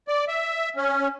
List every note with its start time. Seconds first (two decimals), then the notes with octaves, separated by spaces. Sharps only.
0.08 D5
0.28 E5
0.76 C#4